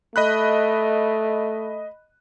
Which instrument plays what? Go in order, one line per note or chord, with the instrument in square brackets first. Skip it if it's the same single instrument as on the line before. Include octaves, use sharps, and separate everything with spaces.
[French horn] A3 [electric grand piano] D#5 B5 F#6